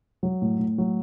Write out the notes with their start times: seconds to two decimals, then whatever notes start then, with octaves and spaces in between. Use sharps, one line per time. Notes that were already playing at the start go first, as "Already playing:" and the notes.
0.23 F#3
0.42 A2
0.59 A2
0.78 F#3